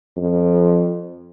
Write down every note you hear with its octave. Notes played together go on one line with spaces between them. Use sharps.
F2